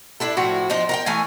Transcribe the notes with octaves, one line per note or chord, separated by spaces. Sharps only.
D4 E4 A4
A2 F3 F#4
F3 D4 D#4
A#4 F#5 G5
E3 A3 F5 G#5